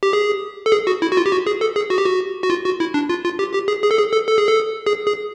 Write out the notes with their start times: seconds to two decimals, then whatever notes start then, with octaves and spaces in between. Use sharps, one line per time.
0.03 G4
0.13 G#4
0.66 A4
0.72 G#4
0.87 F#4
1.02 E4
1.12 F#4
1.17 F4
1.26 G4
1.31 F#4
1.47 G#4
1.61 A4
1.76 G#4
1.90 F#4
1.98 G4
2.06 F#4
2.43 F#4
2.50 F4
2.65 F#4
2.80 E4
2.94 D4
3.09 F4
3.24 F4
3.39 G4
3.53 G4
3.68 G#4
3.83 G#4
3.91 A4
3.98 G#4
4.13 A4
4.27 A4
4.38 G#4
4.48 A4
4.87 G#4
5.07 G#4